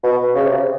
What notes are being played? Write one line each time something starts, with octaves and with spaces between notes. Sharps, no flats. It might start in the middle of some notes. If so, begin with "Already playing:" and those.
B2
C#3
C3